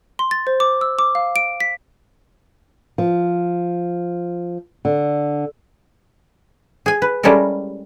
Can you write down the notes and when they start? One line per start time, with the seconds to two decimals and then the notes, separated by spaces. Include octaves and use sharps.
0.19 C6
0.31 A6
0.47 C5
0.60 D6
0.81 E6
0.99 D6
1.15 F5
1.36 D7
1.60 B6
2.98 F3
4.85 D3
6.86 G#4 G#5
7.02 B4
7.23 G3 G#3 C#4 E4 A4 A#4